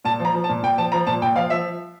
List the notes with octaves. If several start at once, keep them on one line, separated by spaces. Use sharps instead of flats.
A#2 A5
F3
A#5
F3
A5
A#2
A#2 G5
F3 A5
F3 A#5
A#2 A5
A#2 G5
F3 F5
F3 E5